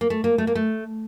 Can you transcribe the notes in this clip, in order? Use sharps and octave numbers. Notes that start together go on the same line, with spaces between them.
A#3
A3
A#3
A3
A#3
A3